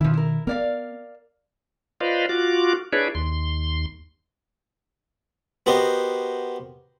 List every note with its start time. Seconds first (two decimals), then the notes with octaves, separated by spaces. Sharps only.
0.01 B2 D#3 F3 E4
0.14 E4 A#4
0.47 B3 A#4 D5 F5
2.00 F4 B4 C5 D5 D#5 F5
2.29 F4 F#4 D6
2.93 D4 E4 G#4 B4 C#5 D5
3.15 D#2 C6
5.66 B3 F#4 G4 A#4 C5 D#5